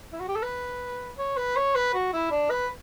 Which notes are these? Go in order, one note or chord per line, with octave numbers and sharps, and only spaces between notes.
E4
F#4
G4
A4
B4
C#5
B4
C#5
B4
F#4
E4
D4
B4